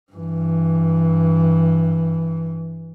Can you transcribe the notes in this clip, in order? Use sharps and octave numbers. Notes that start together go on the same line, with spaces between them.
G2 E3